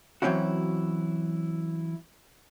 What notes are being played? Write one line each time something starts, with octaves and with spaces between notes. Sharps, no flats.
E3 F#3 C4 C#4 E4 F#4